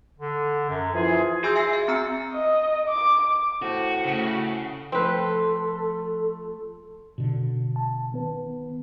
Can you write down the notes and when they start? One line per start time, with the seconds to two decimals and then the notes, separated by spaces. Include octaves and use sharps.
0.19 D3
0.69 F#2
0.94 E3 F3 F4 G#4
1.43 F#4 G#4 G#5 C6 E6 G6
1.56 E5 G#5 E6 A#6 C7
1.73 E5
1.88 C4 A#5 E6 C#7
2.33 D#5
2.89 D6
3.62 A2 F#4 C5
4.05 C#3 A3
4.92 F3 A3 C4 A4 B4 C6
7.18 B2 D3
7.76 A5
8.12 D#3 B3 B4